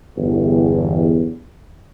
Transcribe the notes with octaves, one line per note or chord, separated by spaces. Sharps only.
G1 E2